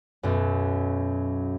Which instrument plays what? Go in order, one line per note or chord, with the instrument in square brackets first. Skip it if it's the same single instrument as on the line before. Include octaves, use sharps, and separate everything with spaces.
[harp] B1 F#2